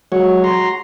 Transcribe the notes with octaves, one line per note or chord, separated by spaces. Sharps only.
F#3 G#3 F#4 C#5
F#4 A#5 C6